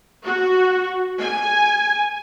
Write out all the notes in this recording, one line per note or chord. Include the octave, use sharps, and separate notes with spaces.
F#4
G#5